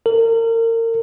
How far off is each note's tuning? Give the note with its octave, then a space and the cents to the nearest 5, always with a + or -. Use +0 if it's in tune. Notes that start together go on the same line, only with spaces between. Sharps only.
A#4 -35